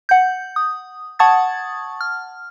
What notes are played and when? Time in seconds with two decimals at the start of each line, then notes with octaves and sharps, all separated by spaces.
0.09 F#5 G6
0.56 D#6
1.19 F#5 A5 C#6 D#6 G#6 A6
2.01 F6